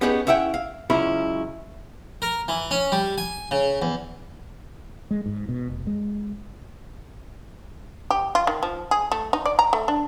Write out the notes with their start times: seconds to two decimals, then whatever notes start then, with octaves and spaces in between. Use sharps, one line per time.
0.01 B3 C#4 D#4 G4 G#4 B4
0.27 C#4 E4 E5 F#5 G5
0.54 F5
0.90 C#2 F#3 C#4 E4 F4 B5
2.22 A#4
2.48 E3
2.71 C#4
2.92 G3
3.18 G#5
3.51 C#3
3.82 E2
5.11 G#3
5.26 G#2
5.49 B2
5.70 F1
5.87 G#3
8.11 G4
8.35 F4
8.47 D#3
8.63 F3
8.91 G#4
9.12 A3
9.33 D#4
9.46 D5
9.59 A#5
9.73 A3
9.88 D4